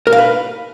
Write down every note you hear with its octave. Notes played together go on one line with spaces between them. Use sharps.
A#4
F5
B4